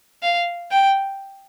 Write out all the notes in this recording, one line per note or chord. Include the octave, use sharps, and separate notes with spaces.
F5
G5